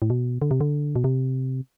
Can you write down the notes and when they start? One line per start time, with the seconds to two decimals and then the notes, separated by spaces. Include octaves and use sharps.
0.02 A2
0.10 B2
0.42 D3
0.51 C3
0.61 D3
0.96 B2
1.04 C3